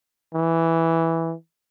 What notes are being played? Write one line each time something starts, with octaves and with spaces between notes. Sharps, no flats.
E3